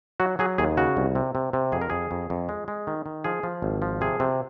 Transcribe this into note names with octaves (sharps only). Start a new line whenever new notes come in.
F#3 F#4
F#3 G#4
D#2 G#4
C#3 F#4
C2
C3
C3
C3
F2 G#4
A#4
F2 G#4
F2
F2
G#3
G#3
D#3
D#3
F3 G#4
F3
G#1
F3
C3 G#4
C3